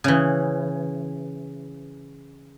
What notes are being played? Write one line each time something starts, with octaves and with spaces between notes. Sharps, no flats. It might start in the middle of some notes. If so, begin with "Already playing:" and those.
C#3 E3